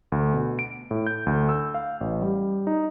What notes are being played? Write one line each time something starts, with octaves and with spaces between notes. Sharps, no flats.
D2
B2
D7
A2
G6
D2
E6
F5
A1
G3
D#4